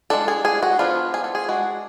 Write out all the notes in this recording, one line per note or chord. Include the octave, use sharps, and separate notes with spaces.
G#3 D4 A4
G#4
G#4
F#4
F3 B3 D4 F4
G#4
A4
G#4
G#3 D4 F#4